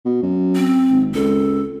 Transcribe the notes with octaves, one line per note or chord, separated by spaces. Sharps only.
B2
F#2
C4
G#1
C#2 A4